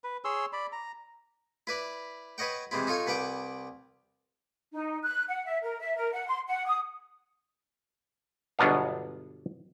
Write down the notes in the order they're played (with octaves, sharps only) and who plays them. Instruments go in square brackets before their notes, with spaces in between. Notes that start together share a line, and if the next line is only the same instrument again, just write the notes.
[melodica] B4
G#4 C#5 C6 E6
D5 B5
A#5
[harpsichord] E4 B4 D5
B4 C#5 D#5 F#5 G5
C3 E3 G#3 C4 E4
D#4 F4 A4 C#5 G#5
C2 B4 F#5 G5 D6
[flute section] D#4
F#6
F#5
E5
A#4
E5
A#4
F#5
C6
F#5
D#6
[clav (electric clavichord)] G1 B2 F#3 B3 D4 F5